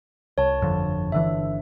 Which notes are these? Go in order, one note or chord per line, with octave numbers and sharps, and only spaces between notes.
C2 C#5 A5
G1 F2 D3
G1 D3 E3 E5